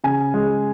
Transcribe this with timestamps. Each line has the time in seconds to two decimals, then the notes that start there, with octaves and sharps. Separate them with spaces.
0.04 C#3 G#5
0.34 G#3